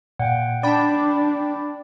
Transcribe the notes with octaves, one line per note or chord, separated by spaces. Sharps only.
A#2 F#5 G5
D4 D5 G5 A5 B5 D6